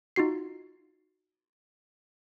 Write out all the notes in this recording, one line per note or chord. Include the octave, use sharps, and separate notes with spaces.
D#4 F4 F#4 C7